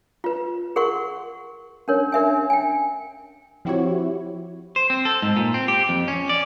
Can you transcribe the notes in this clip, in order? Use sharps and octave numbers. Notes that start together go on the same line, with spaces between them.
F4 B4
G#4 A#4 F#5 C6 C#6
C#4 D4 A#4 C#5
D4 A#4 E5 G#5
G5 G#5
F3 C4 E4 F#4 G4 C#5
C5
C4
A4
G#2
A#2
C4
G4
F2
C#4
D5